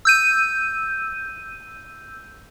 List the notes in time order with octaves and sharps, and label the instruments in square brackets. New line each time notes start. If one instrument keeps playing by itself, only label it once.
[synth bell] E6 G6 D#7